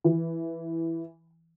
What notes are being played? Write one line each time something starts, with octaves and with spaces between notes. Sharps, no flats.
E3